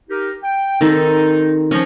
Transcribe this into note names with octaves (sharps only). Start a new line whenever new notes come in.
D#4 G4 A#4
G5
D#3 C4 D#4 A4
F3 C#4 A#5 C#6